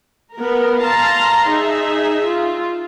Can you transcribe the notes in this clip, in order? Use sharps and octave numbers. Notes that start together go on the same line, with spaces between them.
B3 A#4
F5 A5 A#5 C6
D#4 G#4 E5
F4